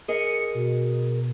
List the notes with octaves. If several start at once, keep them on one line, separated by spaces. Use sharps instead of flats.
G#4 A#4 D#5 C#7
B2